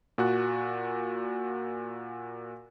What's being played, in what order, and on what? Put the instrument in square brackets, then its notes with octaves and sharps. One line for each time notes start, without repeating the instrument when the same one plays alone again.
[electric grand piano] A#2 F#4 F#6